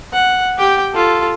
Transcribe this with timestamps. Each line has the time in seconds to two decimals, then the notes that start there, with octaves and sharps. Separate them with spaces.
0.13 F#5
0.58 G4 G5
0.93 F4 A4